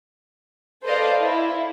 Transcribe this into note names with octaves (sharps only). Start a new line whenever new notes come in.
A4 B4 C5 D5 D#5 F5
E4